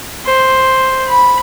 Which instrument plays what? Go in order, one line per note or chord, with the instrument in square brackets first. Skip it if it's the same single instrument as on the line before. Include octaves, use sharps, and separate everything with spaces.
[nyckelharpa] C5
[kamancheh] B5